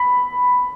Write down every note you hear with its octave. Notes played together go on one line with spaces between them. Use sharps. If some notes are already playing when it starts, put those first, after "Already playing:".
Already playing: B5